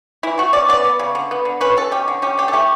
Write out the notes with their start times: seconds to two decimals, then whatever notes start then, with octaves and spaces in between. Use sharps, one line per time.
0.23 E3 E4
0.38 A3 F#4
0.53 C#4 D5
0.69 B3 D5
0.84 B3
0.99 C#3
1.15 D3
1.31 B3
1.45 D3
1.61 C#4 B4
1.77 B2 A4
1.91 C#4 G4
2.08 D3
2.22 C#4 G4
2.38 D3 G4
2.48 A4
2.53 A3 G4